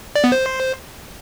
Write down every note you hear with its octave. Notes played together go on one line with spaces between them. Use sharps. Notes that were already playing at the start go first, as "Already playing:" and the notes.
D5
B3
C5